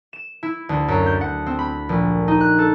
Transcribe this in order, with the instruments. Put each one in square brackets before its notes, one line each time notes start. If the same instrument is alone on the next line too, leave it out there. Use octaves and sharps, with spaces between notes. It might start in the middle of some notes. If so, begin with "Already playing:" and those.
[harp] E7
E4
D2
F#2
G6
F#5
C4
B5
A#1
D#4
F#6
A4